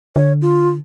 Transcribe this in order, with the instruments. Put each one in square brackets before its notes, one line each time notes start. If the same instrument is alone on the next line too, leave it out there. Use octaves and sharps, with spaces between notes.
[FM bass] D3 [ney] C#5
[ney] F4